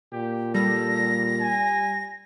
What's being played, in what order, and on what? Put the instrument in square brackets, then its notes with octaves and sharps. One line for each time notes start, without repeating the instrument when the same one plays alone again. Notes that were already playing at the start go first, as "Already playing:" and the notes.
[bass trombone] A#2 [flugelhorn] G4
[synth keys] G3 [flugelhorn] A4 [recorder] A#6
[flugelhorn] G#5